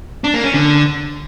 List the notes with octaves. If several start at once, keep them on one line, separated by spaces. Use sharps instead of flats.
D4
A#3
C#4
D3